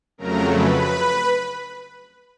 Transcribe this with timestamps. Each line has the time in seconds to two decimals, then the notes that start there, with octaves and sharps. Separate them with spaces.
0.18 F2 C#3 F#3 A3 A#4 A#5
0.53 B4 B5